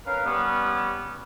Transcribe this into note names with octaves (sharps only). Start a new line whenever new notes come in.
C#4 A#4 B4 F5
G3 B3 C#4